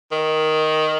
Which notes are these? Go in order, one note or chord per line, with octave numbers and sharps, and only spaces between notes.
D#3